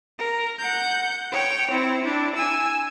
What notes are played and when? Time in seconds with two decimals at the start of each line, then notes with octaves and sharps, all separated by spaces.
0.19 A#4
0.59 F#5 G6
1.32 C#5 G5
1.71 C4 E4
2.02 D4 E4
2.36 G#5 E6